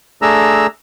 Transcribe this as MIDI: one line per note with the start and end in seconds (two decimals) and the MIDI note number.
0.22 0.67 57
0.22 0.67 62
0.22 0.67 68
0.22 0.67 82
0.22 0.67 88